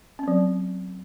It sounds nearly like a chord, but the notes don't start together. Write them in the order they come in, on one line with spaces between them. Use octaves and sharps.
C#4 C4 F#3